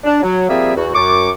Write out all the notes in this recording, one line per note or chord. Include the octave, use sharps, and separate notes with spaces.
D4
F#3
F3 G3 A#3 C4 G#4 E5
E2 F#4
F#2 C#6 D6